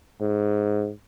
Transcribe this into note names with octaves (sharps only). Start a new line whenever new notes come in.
G#2